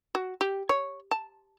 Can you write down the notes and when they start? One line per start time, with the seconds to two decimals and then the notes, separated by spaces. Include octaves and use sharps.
0.15 F#4
0.41 G4
0.69 C#5
1.11 A5